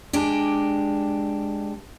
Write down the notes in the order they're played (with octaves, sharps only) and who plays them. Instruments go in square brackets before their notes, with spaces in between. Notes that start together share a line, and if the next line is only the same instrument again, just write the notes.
[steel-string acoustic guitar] G#3 D4 G4